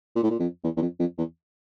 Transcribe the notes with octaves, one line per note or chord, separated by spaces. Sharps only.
A#2
A2
A#2
F2
E2
E2
F2
F2
E2